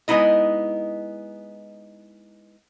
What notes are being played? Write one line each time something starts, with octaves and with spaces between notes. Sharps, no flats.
G#3 B3 D#4 E4 D#5